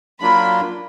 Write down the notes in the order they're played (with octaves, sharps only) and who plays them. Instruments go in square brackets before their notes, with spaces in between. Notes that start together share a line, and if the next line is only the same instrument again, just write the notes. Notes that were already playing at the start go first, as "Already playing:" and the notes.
[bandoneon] F#3 A#3 D4 F4 A#4 [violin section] B5